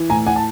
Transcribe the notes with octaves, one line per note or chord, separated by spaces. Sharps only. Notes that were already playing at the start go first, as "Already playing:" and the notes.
Already playing: E3
A2 G#5 A#5
F#5 G#5
A5